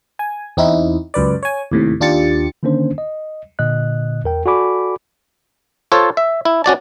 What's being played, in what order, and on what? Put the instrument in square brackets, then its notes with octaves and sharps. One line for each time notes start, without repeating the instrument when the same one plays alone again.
[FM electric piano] G#5
E2 C4 D#4 E4
C#2 F#2 B4 D5
C#5 G#5
D#2 A2 C3
D#2 D4 F4 G4 A6 C#7
[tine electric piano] D3 D#3 A#3 C#4 D4 C5
D#5
A#2 D3 D#5 F#6
E2 A#4 G5
F#4 A4 D5 G#5 B5 D6
[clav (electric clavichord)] F4 A4 C5 C#5
E5
E4
C#4 F#4 D5 A5